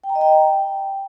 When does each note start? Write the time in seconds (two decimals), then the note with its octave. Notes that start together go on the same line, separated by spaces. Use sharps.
0.04 G5
0.09 A#5
0.15 D#5
0.21 G5